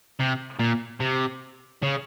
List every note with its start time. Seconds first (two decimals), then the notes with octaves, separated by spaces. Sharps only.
0.20 C3
0.60 A#2
1.00 C3
1.83 C#3